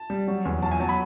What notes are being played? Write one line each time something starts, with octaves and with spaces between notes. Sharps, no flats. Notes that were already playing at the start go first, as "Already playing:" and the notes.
Already playing: A5
G3
F#3
E2
F#3 A5
G#5
F#3 A5
B5